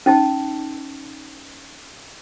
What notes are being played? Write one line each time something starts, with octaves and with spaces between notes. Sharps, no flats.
C#4 D#4 A5